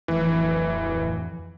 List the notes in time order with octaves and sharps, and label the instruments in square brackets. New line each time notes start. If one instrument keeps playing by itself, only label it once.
[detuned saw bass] D1 [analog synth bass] F2 [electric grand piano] E3